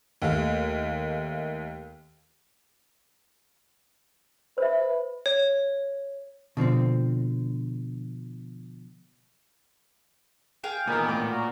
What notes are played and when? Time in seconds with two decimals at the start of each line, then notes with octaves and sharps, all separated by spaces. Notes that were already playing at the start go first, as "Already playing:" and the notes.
0.22 D#2 A3 F5
4.58 B4 C5 E5
5.26 C#5
6.57 B2 D3 F3 C4
10.64 G#4 F5 G5
10.87 A#2 D#3 E3 B3 A#4 G#5
11.08 A2 D6
11.30 F#4 A#4